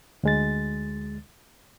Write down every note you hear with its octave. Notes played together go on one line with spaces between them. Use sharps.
D2 G#3 A6